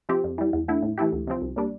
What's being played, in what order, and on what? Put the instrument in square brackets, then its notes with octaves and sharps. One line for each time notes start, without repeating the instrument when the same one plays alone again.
[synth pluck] C3 F3 C4 G4
F2
E3 G3
E2
D3 A3 E4
A2
E3 A3 E4 G4
D2
C3 F3 C4
C2
A#2 G3 D4